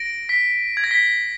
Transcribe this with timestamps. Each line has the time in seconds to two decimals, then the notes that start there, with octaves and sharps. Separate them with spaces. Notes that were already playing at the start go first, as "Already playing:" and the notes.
Already playing: A#6 D7
0.29 B6
0.77 G#6
0.84 A#6
0.91 B6